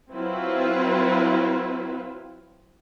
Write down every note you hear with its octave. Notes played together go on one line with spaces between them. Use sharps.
F#3 C4 E4 F4 B4